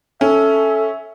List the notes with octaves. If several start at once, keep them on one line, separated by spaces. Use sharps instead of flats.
C#4 A4 E5